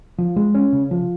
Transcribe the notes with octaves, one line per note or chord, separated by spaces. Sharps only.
F3
G#3
C#4
C#3
F3